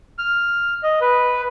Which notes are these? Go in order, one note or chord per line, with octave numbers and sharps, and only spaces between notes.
F6
D#5
B4